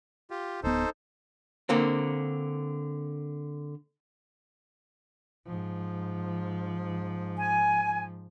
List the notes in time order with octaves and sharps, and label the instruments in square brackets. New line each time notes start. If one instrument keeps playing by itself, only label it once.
[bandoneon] F4 G4
[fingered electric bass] D1 B3 [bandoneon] D#4 A4 C5
[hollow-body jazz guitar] D3 A#3 C4
[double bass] G#2 F3
[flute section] G#5